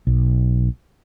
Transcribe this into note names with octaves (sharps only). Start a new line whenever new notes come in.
B1